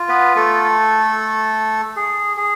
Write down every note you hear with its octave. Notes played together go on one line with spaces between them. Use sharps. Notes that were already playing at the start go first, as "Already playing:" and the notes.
Already playing: F4
B3 B4
A3 A4
G#4
G#4